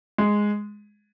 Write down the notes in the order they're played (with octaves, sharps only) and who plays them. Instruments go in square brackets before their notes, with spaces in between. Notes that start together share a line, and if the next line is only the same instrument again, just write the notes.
[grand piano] G#3